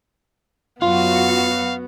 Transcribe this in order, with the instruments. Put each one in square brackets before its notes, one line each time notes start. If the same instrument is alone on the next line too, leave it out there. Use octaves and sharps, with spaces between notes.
[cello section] F#2 F#4 [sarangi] B3 [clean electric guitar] F4 [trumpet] F5